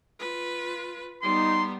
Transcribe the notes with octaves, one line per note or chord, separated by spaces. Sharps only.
F4 B4
G3 B3 D#4 C6